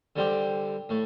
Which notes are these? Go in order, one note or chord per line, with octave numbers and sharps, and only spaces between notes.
D3 G3 C4 G4
A2 A3